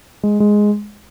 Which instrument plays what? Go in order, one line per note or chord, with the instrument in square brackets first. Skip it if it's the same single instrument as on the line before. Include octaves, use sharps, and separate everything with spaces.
[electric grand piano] G#3
G#3